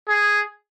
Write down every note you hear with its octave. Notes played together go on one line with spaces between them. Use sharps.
G#4